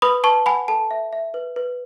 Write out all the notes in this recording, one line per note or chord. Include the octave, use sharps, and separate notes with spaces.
B4 B5 D#6
B4 A5 C#6
F#5 G#5 B5
A4 A5
E5
E5
B4
B4